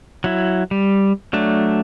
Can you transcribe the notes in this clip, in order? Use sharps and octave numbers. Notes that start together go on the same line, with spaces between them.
F#3 E4
G3
F#3 A3 D4